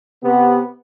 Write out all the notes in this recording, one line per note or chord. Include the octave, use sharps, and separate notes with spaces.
C3 B3